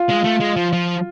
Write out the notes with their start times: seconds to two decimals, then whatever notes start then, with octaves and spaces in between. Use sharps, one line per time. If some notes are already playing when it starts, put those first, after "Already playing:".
Already playing: F4
0.10 G#3
0.25 A3
0.41 G#3
0.57 F3
0.73 F3